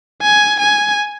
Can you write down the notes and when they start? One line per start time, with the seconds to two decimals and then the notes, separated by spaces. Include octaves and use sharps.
0.22 G#5
0.60 G#5